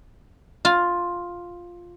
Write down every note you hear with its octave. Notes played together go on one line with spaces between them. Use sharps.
F4